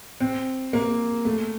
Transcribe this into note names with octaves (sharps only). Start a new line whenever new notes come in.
C4
A#3
A3